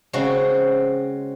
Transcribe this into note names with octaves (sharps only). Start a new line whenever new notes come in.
C#3 G#3 C4 F#4